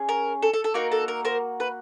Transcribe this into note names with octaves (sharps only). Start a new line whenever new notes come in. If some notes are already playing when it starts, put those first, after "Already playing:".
Already playing: C#4 G#4
A#4
A4
A4
A4
A#3 D#4 F#4 A#4
A4
A#4
A#4 C5
B4